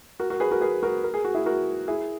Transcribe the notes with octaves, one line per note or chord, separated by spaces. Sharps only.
F#4 A#4
F#4 A#4
G#4 B4
F#4 A#4
G#4 B4
F#4 A#4
A#4
G#4
F#4
E4 G#4
F#4 A#4
E4 G#4